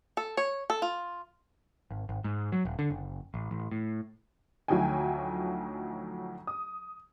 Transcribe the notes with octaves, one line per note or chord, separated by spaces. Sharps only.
A4
C#5
A4
F4
G#1
G#1
G#2
F#3
D#1
D3
F#1
A1
A1
A2
D2 F3 F#3 D#4 G5 G#5
D#6